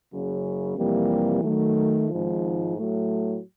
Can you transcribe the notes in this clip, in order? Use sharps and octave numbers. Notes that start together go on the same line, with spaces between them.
F#1 F#2 C#3
F2 C3 E3 G3 A#3
D#3 F#3 A3
G#1 G#2 F3
A2 F#3 A3